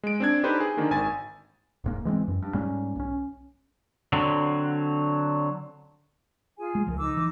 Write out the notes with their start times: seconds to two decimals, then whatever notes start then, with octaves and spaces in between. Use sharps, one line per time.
0.03 G#3 D7
0.20 C4 D4 G#6
0.43 D4 D#4 G4 A4 B4 C5
0.60 G#4
0.77 D3 D#3 A#3 D4
0.91 G#1 G#5 A6
1.84 D1 G#2 A#3
2.05 E3 G#3 A3 C4
2.28 F#2
2.42 G2
2.54 G#2 G3 A#3 C#4
2.96 B1 C#4
4.13 D3 F#3 C4
6.59 F4 G#4 G#5
6.75 G#3
6.87 C#2 F3 A#4
6.98 D#4 D6 E6
7.17 E3